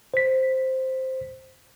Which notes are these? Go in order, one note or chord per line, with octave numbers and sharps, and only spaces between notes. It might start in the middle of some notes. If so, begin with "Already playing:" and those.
C5 B6